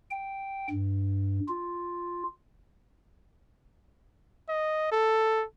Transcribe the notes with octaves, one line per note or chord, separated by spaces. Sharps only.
G5
G2
F4
D#5
A4